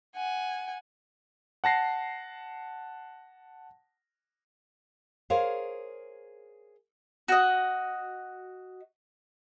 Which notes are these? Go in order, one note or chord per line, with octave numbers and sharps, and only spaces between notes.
F#5 G#5
F#5 A5 A#6 C7
G#4 A#4 C5 C#5 F5
F#4 D#5